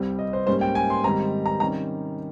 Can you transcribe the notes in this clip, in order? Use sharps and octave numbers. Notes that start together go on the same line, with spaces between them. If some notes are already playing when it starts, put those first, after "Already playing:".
Already playing: C2 C3 G3 C4
D#5
C5
G#2 G3 A#3 C#4 C5
G5
G#5
C6
G#2 D#3 G3 C4 A#5
A#5
C3 D#3 G3 C#4 A#5